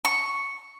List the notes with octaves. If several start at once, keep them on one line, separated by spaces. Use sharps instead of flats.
C#6